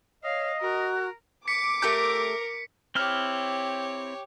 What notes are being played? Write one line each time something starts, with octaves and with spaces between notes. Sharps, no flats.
C#5 D#5 F5
F#4 A#4
D6 B6 C#7
A3 G4 A#4 G6
C4 E4 G4 C#5 F6